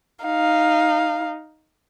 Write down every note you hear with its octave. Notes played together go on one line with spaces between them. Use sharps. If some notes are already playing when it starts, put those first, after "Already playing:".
D#4 F5